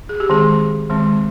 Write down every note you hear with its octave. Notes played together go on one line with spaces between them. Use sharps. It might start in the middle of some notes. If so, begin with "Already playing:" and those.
G#4
G4
D#3 G#3 C4 G#4
D#3 G#3 C4